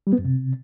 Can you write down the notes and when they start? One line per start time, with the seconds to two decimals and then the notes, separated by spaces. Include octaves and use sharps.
0.07 G3
0.13 B3
0.19 F#2
0.24 C3